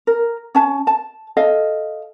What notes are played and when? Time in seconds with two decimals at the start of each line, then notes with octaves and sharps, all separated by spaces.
0.07 A#4
0.55 C#4 A5
0.87 A5
1.37 A4 D#5 F5